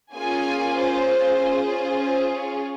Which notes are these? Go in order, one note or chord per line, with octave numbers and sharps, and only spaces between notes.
A#3 C#4 F4 G#4 G#5
C5
C#4 F4 G#4
C5
C5
C#5